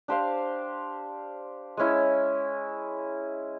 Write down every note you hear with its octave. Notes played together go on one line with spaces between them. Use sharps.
D4 G4 C5 F5
G#3 C#4 E4